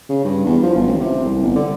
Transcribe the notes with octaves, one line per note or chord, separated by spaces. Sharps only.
C#3
G2
E2
F3
G1
A1
C3
C2
G1
D3